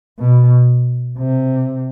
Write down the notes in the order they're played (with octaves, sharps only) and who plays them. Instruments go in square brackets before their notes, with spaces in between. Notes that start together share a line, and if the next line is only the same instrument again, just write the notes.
[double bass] B2
C3